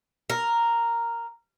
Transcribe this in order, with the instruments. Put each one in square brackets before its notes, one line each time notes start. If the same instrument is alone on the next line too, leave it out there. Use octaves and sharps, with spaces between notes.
[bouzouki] A#4